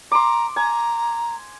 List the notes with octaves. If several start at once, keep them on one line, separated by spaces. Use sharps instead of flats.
A#5 C6 D6
G#5 A#5